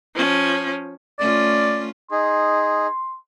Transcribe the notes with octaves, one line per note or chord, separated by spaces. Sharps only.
F3 C#4
A3 C#4 F4 D5
D#4 G#4 C6